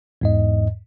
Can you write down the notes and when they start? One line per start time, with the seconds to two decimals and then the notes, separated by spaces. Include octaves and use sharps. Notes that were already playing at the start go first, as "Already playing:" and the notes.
0.21 E2 G#2 D#5